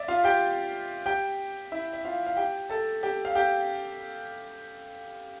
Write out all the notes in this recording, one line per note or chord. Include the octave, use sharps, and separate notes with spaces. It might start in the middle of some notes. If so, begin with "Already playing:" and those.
Already playing: D5 E5
F4 F5
G4 G5
G4 G5
E4 E5
E5
F4 F5
F5
G4 G5
A4 A5
G4 G5
F5
G4 G5